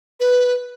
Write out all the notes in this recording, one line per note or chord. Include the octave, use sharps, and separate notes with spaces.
B4